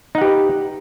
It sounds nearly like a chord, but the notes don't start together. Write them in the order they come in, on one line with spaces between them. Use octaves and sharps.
D#4 F#5 G4 B4